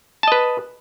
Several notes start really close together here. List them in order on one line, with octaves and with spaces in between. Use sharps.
A5 D#5 B4